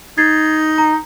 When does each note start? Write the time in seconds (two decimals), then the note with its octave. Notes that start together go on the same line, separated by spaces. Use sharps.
0.18 D#4 G#6 A6 C7
0.78 A#5